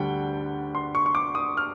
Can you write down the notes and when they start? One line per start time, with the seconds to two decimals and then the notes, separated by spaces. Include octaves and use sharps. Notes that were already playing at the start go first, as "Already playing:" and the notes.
Already playing: D2 D3 G3 F#5 G5
0.75 C6
0.95 C#6
1.06 C#6
1.15 D6
1.35 D#6
1.57 F6